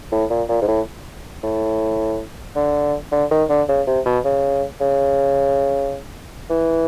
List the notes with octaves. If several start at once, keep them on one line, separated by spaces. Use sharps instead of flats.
A2
A#2
A#2
G#2
A2
A2
D3
D3
D#3
D3
C#3
C3
B2
C#3
C#3
E3